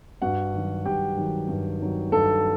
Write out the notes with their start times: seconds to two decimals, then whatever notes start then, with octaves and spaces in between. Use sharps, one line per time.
0.22 G2 F#4 F#5
0.54 D#3 F#3
0.85 G2 G4 G5
1.17 D#3 F#3
1.48 G2
1.80 D#3 F#3
2.12 G2 A4 A5